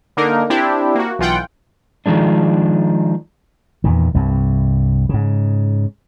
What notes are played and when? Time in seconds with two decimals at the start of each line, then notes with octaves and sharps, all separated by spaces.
0.17 D3 A#3 D4 D#4 A#4
0.50 C4 D4 E4 G4
0.95 A#3 F#4
1.19 B1 E3 F4 F#5 G5
2.06 D#3 F3 G#3 D4
3.84 E2 A#2 D#3
4.15 C2 G2
5.09 G#2 C#3